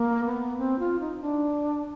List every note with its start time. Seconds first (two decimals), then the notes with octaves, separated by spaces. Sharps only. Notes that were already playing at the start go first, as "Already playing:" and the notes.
Already playing: A#3
0.25 B3
0.58 C4
0.79 F4
1.00 D#4
1.21 D4